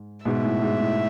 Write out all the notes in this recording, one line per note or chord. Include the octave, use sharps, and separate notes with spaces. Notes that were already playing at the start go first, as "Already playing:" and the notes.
Already playing: G#2
G#2 B2 E5
A2
G#2
A2